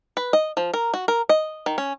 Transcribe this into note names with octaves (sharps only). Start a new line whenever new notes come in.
B4
D#5
F3
A#4
F#4
A#4
D#5
D#3
C#4